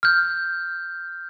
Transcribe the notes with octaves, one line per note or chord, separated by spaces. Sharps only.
F6 G6